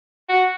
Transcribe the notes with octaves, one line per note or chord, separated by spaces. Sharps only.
F#4